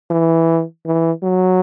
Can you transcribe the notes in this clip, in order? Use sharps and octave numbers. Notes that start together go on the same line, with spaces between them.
E3
E3
F#3